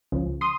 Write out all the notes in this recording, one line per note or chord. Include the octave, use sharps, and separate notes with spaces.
C#2 C#3 F3
C6 D#6